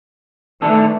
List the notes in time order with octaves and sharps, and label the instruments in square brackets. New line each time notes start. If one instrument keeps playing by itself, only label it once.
[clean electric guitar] D#3 D4 A4 [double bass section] E3 A3